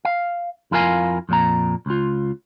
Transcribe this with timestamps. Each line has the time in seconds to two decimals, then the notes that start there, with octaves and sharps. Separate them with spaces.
0.05 F5
0.71 F2 E4 F4 A#4 F5 G#5
1.29 F2 A#2 A#5
1.86 C#2 F4